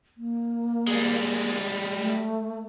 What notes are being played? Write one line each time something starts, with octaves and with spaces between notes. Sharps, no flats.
A#3
G3 G#3
A3